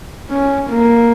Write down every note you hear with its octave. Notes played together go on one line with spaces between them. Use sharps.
C#4
A#3